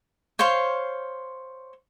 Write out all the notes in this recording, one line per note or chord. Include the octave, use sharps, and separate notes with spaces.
C5 C#5 F5 C6